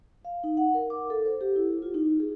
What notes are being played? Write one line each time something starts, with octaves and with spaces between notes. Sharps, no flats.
F5
D#4
F#5
A#4
D6
A4
C5
G4
E4
F4
D#4
G#4